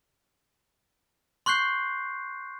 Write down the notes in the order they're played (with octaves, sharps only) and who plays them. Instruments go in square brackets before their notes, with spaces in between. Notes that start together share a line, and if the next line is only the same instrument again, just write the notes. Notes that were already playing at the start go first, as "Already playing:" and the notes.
[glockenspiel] C6 C#6 F#6 G6 C7